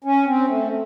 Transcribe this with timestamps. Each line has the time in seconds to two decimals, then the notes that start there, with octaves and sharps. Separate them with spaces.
0.04 C#4
0.26 C4
0.48 A3